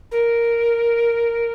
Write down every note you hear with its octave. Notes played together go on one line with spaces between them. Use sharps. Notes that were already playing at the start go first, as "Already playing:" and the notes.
A#4